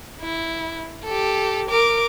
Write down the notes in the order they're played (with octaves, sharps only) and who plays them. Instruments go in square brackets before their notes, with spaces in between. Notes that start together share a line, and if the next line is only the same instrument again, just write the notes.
[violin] E4
G4 A4
A#4 D6